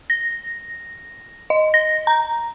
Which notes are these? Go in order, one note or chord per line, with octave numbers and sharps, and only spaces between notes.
A#6
D#5
A#6
A#5